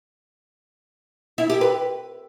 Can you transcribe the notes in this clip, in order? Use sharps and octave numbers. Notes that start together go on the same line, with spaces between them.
E4
G4
B4